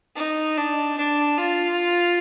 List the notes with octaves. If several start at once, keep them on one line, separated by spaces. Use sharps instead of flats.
D#4
D4
D4
F4